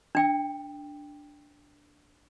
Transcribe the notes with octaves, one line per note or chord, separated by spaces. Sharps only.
D4 G5